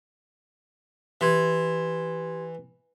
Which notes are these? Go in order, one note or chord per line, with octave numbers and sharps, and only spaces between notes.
E3 G4 C6 G#6